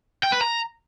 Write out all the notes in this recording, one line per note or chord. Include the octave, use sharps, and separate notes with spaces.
G5
B4
A#5